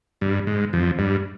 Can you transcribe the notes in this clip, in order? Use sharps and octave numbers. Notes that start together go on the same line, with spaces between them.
G2
G#2
F2
G2